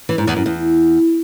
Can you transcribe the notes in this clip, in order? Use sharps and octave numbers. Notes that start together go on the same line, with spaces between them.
E3
G#2
E2
F#2
E2